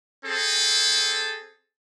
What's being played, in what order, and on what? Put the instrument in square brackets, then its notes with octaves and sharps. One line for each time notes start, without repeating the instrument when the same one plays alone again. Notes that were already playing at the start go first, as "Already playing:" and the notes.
[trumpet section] C4 G#4 A4